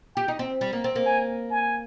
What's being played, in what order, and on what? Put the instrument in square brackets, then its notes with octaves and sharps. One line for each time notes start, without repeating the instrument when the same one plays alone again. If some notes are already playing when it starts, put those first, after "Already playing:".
[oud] G4 [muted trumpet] G5
[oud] D#4
C4
G3
A#3
C4
A#3
[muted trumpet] G#5
G#5